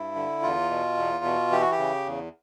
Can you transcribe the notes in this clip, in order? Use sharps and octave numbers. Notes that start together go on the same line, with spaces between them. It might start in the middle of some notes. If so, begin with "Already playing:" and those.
Already playing: G2 E4
D3
E2 F4
B2
E2
B2
E3 G4
F#4
G4
C#3
E2